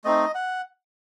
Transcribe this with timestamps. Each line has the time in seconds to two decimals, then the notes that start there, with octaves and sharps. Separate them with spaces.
0.04 A3 C4 D#4 D#5
0.35 F#5